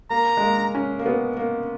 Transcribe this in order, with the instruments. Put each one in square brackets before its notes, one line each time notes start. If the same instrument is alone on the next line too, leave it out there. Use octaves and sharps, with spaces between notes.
[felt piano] A#3 [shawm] A#5
[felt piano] G#3
A#3
C#4
A#3
B3
A#3